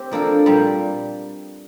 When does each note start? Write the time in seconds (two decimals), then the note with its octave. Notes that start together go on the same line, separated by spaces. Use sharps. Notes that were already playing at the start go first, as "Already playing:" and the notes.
Already playing: C4 G4 C5
0.11 F3 A#3 D4 A4
0.46 A#2 G3 A#3